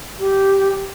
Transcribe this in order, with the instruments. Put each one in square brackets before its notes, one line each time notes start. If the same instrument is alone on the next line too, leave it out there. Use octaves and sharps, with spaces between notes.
[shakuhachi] G4